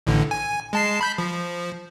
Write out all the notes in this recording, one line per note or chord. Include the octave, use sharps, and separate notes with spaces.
A1 A2 D3
G#5
G#3 A5 C7
B5 G6 B6
F3